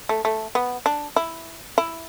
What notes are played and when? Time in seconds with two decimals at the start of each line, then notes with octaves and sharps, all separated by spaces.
0.09 A3
0.25 A3
0.55 B3
0.86 D4
1.16 E4
1.78 E4